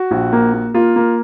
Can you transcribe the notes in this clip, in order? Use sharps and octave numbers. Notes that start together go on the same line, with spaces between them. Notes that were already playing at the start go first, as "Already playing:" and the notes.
Already playing: F#4
A#1
A#3
A#3
A#3 F4
A#3